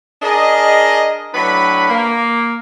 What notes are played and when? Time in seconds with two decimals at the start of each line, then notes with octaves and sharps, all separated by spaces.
0.22 D4 G#4 A#4 D#5
1.34 A2 F#3 D4 B4 B5
1.90 A#3